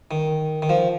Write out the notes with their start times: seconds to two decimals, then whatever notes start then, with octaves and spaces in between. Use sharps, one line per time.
0.11 D#3
0.62 D#3
0.69 F3